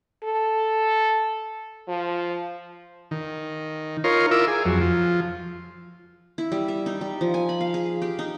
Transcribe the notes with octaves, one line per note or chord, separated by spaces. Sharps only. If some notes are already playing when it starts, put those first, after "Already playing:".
A4
F3
D#3
D#4 F4 A#4 C#5 C6
E4 F4 A#4 D6 E6
G#4
F2 F#3
F3
E4
G3
E5
D#4
G3
F3
G#5
B5
F5
G#4
G4
D#4